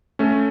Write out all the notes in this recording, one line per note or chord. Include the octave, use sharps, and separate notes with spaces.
A3 C#4